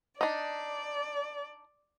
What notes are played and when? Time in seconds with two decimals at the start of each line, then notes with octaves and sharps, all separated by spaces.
0.21 D4 D#4 D5